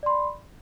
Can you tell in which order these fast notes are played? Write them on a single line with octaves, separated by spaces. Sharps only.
D5 C6 B5